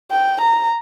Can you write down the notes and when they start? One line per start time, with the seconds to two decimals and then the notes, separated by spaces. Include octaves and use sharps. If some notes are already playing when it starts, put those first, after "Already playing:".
0.11 G5
0.41 A#5